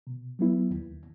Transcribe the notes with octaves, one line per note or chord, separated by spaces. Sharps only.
B2
F#3 B3 E4
D#2